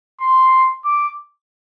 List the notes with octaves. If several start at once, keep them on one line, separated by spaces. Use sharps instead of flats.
C6
D6